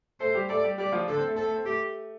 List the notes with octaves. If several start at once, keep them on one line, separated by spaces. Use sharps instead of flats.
A3 A4 C5
G3 G4
A3 A4 D5
G3 G4
G3 G4 D5
F3 F4
D3 D4 A4
C4
A3
C4 A4
A3
C4
A3 G4